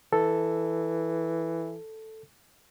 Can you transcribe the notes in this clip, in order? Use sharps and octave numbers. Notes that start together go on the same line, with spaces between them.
E3 A4